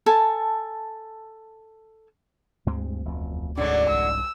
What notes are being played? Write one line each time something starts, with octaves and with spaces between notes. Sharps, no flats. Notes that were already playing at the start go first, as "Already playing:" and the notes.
A4 G#5 A5
D2 G2 G#3 C4
E1 F2
E1 G#2 D3 F#3 G#3 C#4 D5
C2 E6